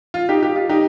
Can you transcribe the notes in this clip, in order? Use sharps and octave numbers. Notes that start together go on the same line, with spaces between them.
F4
D#4 G4
G4
F4
D#4 G4